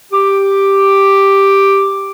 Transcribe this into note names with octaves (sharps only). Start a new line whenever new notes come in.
G4 D6